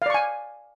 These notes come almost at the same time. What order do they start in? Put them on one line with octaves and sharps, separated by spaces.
F5 D5 C#6 G#5